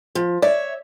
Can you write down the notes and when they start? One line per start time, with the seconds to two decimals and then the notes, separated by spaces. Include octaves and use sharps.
0.15 F3
0.42 C#5 D5 E5